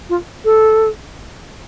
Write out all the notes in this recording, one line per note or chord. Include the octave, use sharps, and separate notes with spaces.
F4
A4